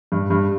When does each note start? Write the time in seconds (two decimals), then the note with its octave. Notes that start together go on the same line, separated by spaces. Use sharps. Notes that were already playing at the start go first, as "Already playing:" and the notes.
0.12 G2
0.30 G2